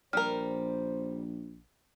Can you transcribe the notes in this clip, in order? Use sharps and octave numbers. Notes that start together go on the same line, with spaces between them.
A#1 G3 A#4 C5 F6